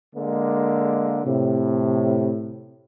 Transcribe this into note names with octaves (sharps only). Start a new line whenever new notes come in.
D3 G#3 A#3
A2 C3